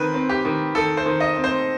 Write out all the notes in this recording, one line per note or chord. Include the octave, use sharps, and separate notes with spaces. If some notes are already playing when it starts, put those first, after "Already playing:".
Already playing: D#3 C4 B4
C4
G4
D#3
D#3 A4
C5
D#3
D#5
C4
C5